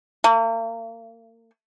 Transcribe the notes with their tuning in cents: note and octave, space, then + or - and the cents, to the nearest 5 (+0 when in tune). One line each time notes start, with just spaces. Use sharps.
A#3 -40